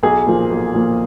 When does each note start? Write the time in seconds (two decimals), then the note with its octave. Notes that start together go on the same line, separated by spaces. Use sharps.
0.03 B1 G#4
0.27 A#2 F3 A#3
0.50 B1
0.74 A#2 F3 A#3